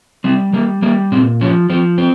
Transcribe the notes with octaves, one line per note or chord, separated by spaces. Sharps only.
G3 C4
G3 A#3
G3 A#3
A#2 C4
F3 C#4
F3 C4
C4